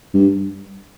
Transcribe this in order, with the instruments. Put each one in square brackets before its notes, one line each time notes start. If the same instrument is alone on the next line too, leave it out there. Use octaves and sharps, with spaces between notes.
[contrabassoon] G2